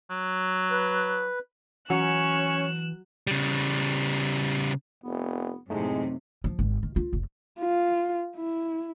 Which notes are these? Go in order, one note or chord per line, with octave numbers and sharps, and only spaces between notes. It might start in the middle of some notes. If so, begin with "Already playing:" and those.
F#3
B4
E3 F#3 C#4 C#5 F#6 E7
C#3 G3
F1 B3
F#2 A2 C3 G#3 A3 D#4
F3
G#1
D#3
F4
F1
F4
E4